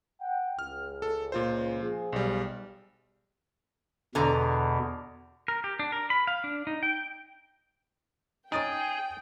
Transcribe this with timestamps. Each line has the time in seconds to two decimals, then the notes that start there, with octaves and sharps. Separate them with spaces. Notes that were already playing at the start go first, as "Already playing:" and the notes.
0.21 F#5 G5
0.59 C#2 F6
1.02 A4
1.32 A#2 F4 C5
1.82 F3 G#4
2.13 B1 G3
4.15 E2 B2 D3 A#5
5.48 A#4
5.64 G4
5.79 D4
5.92 A#4
6.10 B5
6.27 F5
6.44 D4
6.67 D#4
6.83 G5
8.52 C#4 D#4 G#4 G5 D#6 A6 D7